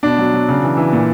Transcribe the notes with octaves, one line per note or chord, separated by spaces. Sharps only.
B2 D4
F#3
F#3
C#3
E3
E3
A#2